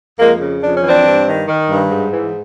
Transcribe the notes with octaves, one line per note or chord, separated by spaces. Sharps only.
F2 G#3 A#3
C#3
F2 D4
C#4
E3
C4 D4
G2
D#3
D#3
G2
G#2
E3